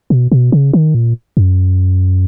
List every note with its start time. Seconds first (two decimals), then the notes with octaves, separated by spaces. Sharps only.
0.10 B2
0.32 B2
0.52 C#3
0.73 D#3
0.95 A#2
1.37 F#2